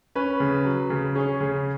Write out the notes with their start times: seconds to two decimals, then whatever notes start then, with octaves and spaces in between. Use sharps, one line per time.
0.15 C#4 B4
0.40 C#3
0.65 F#3
0.90 C#3
1.15 C#4 G#4
1.41 C#3